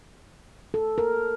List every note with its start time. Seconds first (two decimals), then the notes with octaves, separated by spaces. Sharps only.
0.74 A4
0.98 A#4